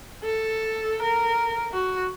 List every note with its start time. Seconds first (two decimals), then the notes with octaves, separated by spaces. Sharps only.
0.23 A4
1.02 A#4
1.72 F#4